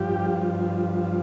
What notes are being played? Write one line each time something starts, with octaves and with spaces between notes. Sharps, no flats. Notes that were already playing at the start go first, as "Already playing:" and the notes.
Already playing: G2 F3 G4